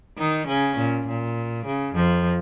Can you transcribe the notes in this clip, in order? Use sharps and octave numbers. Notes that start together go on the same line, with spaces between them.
D#3 D#4
C#3 C#4
A#2
A#2
C#3
F2 F3